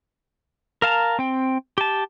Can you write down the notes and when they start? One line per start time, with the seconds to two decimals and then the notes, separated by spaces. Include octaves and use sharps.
0.82 A#4 F5 A5 A#5
1.19 C4 G5
1.78 G4 A5